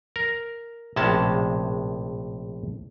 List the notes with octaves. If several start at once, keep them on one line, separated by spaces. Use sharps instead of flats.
A#4
A#1 A2 C3 G#3 C#4 A5